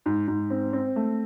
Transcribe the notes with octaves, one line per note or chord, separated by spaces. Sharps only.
G#2
G#2
C4
C4
A3